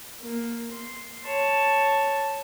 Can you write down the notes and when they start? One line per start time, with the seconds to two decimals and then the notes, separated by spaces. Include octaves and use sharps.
0.21 A#3
0.72 C6
1.24 C#5 A5